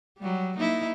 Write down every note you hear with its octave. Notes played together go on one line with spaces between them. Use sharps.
F#3 G3
A#3 D#4 E4